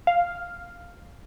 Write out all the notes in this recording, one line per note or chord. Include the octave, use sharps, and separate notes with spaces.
F5